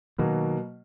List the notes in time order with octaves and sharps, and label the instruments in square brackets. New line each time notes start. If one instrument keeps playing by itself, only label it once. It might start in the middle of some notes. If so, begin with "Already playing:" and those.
[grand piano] B2 F#3 A#3 [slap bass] D#3